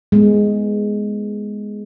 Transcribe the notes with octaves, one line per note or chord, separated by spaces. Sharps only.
G#3 B3